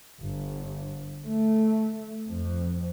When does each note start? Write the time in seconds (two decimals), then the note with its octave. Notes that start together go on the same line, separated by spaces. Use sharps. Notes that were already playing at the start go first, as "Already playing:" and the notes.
0.22 G1
1.25 A3
2.29 F2